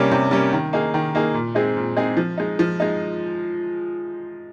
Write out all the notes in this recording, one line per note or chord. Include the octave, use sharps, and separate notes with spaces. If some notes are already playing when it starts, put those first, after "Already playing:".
Already playing: C3 G3 A#3 C#4
C3
G3 A#3 C#4
D#3
A#3 D#4 G#4
D#3
A#3 D#4 G#4
A#2
G#3 C4 D#4 G#4
A#2
G#3 C4 D#4 G#4
F3
G#3 D#4
F3
G#3 D#4